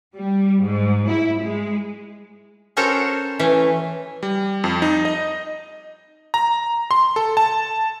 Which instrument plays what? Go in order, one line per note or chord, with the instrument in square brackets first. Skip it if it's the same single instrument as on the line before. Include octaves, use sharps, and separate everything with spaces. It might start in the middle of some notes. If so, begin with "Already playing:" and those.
[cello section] G3
G#2
E4
G#3
[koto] C#4 F#4 A4 A#4 C5 C#5
E3 A3 C#4
[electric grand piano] G3
F2
D#4
D#5
A#5
C6
A4
A5